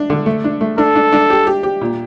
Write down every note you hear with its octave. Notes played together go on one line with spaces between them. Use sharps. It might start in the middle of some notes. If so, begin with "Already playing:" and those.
Already playing: D4
D3
A3
D4
A3
D4 A4
D4
D4
G4
G4
G4
A#2